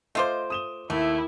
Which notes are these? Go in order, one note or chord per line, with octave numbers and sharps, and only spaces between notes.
A3 F4 C5 D#5 D6
D#6 E7 G7
D#2 A3 E4